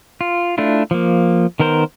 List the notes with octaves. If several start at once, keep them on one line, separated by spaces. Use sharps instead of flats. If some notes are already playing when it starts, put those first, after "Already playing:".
F4
A3 D4 E4 F4
F3 A#3
D#3 B3 A#4 C5